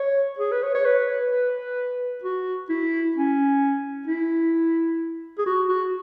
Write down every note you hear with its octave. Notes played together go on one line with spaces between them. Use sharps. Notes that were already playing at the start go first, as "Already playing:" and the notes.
Already playing: C#5
G#4
B4
C#5
C#5
B4
B4
F#4
E4
C#4
E4
G#4
F#4
F#4